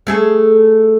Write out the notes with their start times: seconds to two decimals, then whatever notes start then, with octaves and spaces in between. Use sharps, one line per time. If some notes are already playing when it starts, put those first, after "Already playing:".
0.07 A3 G#4 A4